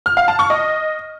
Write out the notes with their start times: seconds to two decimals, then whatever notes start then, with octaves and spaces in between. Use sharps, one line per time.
0.06 F6
0.17 F5
0.28 A5
0.39 C#6
0.50 D#5